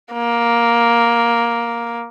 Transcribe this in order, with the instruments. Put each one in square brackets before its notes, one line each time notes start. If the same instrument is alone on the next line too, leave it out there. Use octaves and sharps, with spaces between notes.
[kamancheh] A#3